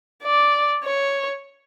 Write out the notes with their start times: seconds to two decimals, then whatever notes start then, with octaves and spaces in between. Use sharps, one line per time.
0.23 D5
0.84 C#5